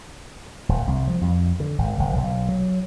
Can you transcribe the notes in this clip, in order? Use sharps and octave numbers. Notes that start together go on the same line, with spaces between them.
D#1
C2
F3
F2
D3
G#1
F#1
B1
F#3